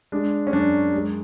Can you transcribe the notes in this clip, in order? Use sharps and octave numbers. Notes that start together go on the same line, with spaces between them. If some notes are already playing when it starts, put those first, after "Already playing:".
G#3 D4
C#4
F#2 D4
G#3